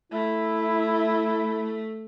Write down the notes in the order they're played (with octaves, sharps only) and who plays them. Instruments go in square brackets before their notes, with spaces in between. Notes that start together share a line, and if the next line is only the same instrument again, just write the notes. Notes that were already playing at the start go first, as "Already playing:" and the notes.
[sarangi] A3 [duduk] E4